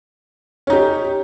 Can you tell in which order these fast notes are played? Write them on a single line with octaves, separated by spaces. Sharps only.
C#4 D#4 G4